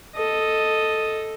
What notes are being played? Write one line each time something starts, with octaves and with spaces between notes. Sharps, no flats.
A4 D#5